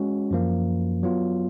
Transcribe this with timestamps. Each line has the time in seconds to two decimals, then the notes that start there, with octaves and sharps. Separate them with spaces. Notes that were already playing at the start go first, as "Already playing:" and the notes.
Already playing: G#3 C#4 F#4
0.31 F#2 F3 A#3
1.03 F#3 B3 F4